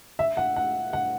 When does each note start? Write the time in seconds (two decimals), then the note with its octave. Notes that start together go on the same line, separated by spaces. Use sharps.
0.19 E5
0.37 F#5
0.56 F#5
0.93 F#5